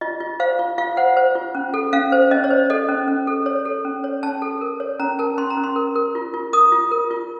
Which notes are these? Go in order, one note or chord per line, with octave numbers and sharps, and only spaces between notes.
F4 D#5
F4
C5 F5
F4
F4 F5
C5 F#5
C5
F4
C#4
A4
C#4 F5
C5
C#4 D#5
C#5
C5
A4 D#5
C#4
C#4
A4
C#5
A4
C#4
C#5
C#4 A5
A4
A#4
C#5
C#4 A#5
A#4 A5
C#4 C6
A#5
C#4
C6
A#4
A#4
F4
F4
A#4 D#6
F4
A#4
F4